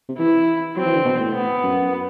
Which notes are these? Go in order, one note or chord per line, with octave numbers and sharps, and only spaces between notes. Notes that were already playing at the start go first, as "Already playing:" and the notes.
C3
E3 E4
F#3 C4
E3
D3
B2
A2
B3
F#2